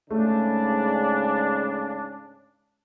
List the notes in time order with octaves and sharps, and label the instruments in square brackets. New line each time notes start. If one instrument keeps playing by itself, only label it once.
[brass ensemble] G#2 C#3 D4 [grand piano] A3